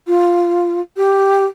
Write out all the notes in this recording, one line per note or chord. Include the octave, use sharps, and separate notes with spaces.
F4
G4